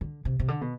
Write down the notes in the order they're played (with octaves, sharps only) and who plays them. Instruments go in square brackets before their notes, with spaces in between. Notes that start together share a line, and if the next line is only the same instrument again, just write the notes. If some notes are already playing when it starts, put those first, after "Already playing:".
[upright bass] D3
C3
C3
D3
B2